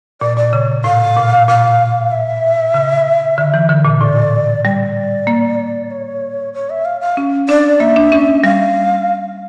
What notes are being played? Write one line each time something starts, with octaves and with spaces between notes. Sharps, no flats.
A#2 D5
A#2 D5
C#3 C#5
A2 F5
A#2
A#2 F5
E5
C#3
D3
E3
D3
A#2
A2 D5
G3 D5
A#3
C#5
C#5
E5
F5
F5
C#4
D4 D5
A#3 E5
D4
C#4
G3 F5